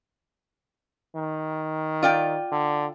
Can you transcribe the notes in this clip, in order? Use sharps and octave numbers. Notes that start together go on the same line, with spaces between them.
D#3
F4 D5 G5
D3